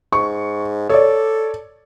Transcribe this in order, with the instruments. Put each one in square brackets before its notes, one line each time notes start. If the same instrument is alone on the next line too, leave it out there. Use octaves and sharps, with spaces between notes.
[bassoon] G#2 [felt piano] C#6
[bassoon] A4 [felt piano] C#5 D5